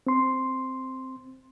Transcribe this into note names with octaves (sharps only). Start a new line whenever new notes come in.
C4 C6